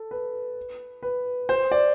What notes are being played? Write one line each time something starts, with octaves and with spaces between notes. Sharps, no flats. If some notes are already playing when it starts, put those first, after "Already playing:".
Already playing: A4
B4
B4
C5
D5